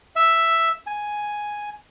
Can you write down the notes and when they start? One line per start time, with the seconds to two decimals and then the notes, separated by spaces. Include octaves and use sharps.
0.16 E5
0.87 G#5